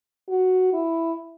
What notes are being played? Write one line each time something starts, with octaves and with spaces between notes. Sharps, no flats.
F#4
E4